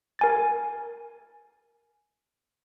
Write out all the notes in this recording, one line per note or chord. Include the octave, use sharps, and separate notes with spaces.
A#4 G#5 A6